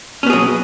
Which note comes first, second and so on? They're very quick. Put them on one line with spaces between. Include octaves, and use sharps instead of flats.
C#4 B3 G#4 F#3